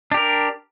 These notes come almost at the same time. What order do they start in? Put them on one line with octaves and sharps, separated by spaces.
D4 G4 A#4